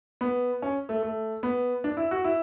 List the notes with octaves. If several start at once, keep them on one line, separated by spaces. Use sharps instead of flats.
B3
C#4
A3
A3
B3
D4
E4
F#4
E4